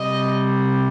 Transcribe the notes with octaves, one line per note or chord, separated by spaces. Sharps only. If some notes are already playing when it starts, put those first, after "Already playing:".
Already playing: C3 G3 D#5